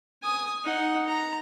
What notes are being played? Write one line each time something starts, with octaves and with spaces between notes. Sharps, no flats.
G#5 D#6
D#4 F#5
A#5